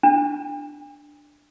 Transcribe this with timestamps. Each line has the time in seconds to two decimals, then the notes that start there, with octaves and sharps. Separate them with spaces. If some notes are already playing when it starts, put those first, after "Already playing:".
0.03 D4